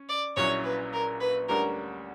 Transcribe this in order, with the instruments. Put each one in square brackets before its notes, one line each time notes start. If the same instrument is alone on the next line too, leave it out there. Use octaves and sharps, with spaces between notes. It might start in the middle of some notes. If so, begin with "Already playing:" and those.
Already playing: [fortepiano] C#4
[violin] D5
[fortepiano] A#1 A#2 F#3 C#4 E4 [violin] C#5
[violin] B4
A#4
B4
[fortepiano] D2 D3 G3 C#4 [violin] A#4